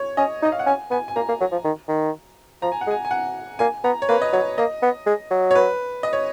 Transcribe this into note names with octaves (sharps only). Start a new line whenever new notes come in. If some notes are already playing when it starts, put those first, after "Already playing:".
Already playing: C#5
C#4 D#5
D#4
D#5
F5
F#5
C#4 G#5
B3 G#5
G#5
A#3 A#5
A#3
F#3
F3
D#3
D#3
F3 A#5
G#5
F#5
G#3
G#5
G#5
F#5
A#3 G#5
B3 A#5
C#5
A#3 B4
D#5
F#3 C#5
A#3 D#5
B3
G#3
F#3
C#5
B4
D#5
C#5